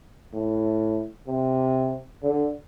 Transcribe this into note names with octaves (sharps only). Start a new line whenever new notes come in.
A2
C3
D3